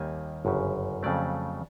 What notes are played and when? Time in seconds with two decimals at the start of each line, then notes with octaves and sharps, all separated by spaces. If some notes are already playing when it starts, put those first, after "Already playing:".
Already playing: D#2 D#3 G3 A#3 G#5
0.45 G1 F#2 C#3
1.03 F2 C#3 F#3 A3 D5